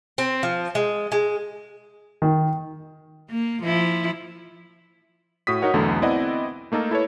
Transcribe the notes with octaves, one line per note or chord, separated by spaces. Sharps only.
C4
F3
G#3
G#3
D#3
A#3
F3 E4
A2 F#4 D#6 B6
D#4 F#4 A#4 C#5 F#5
B1 E2 D3 A3
B3 C4 E4 D5 D#5 F#5
A3 A#3 D#4 A4 A#4
E4 A4 B4 C#5